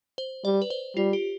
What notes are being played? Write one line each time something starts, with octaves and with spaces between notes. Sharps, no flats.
C5
G3 D5
B4
C5
G3 F4
G4